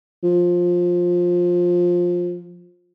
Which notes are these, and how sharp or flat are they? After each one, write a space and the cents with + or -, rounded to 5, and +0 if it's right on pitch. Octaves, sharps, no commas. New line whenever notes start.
F3 +15